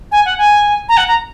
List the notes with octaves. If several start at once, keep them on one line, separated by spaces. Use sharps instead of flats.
G#5
F#5
G#5
A#5
F#5
A#5